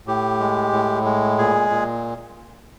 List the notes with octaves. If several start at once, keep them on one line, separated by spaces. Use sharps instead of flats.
A2 G4
G#3
A2
G#3
A#2 G#4
A#2